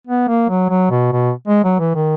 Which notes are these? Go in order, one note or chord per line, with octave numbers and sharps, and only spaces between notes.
B3
A#3
F#3
F#3
B2
B2
G#3
F#3
E3
D#3